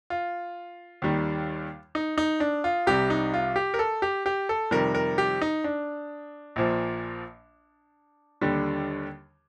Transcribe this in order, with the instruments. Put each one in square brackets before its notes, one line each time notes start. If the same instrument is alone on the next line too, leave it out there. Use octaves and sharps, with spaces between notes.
[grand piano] F4
D#2 D#3 G3
D#4
D#4
D4
F4
C2 C3 G3 G4
D#4
F4
G4
A#4
A4
G4
G4
A4
F2 C3 D#3 G3 A#4
A#4
G4
D#4
D4
A#1 A#2 F3
D#2 D3 G3